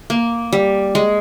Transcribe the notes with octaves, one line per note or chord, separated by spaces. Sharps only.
A#3
G3
G#3